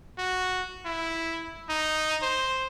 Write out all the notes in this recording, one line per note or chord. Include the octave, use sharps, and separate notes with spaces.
F#4
E4
D#4
C5